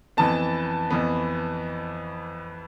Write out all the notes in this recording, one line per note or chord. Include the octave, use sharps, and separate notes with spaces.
F2 E3 B3 A5
F2 E3 B3